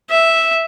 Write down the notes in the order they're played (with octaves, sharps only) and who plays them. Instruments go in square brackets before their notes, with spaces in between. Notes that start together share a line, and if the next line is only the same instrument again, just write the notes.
[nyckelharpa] E5